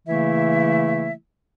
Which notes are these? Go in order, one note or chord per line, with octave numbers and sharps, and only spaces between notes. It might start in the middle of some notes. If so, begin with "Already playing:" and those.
C#3 E3 A3 A#3 E4 E5